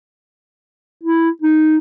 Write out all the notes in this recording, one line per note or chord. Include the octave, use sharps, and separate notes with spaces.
E4
D#4